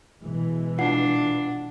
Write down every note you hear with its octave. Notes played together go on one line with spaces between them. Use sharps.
B2 E3 G#3
D4 F4 F#5 C7